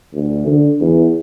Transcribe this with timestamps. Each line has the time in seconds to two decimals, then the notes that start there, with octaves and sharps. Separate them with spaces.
0.13 D2
0.46 D3
0.81 E2